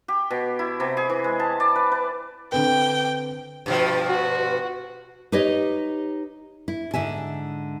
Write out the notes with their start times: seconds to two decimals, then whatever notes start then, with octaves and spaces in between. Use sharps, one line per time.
0.08 G4
0.31 B2
0.59 E4
0.80 C3
0.97 G#4
1.10 E3
1.24 G#3
1.40 A5
1.60 D5
1.76 B4
1.92 B4
2.52 D3 C4 B4 G5
3.66 G2 B2 F3
4.07 F#4
5.32 D#4 G4 B4 C#5 D#5
6.68 E4
6.94 G#2 D3 E5 G#5